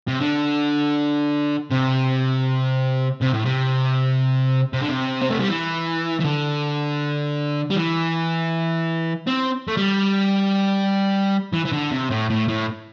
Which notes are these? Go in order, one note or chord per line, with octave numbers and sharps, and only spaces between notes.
C3
D3
C3
C3
A2
C3
C3
D3
C3
C4
A3
G3
E3
E3
D3
G3
E3
C4
A3
G3
E3
E3
D3
C3
A2
A2
A2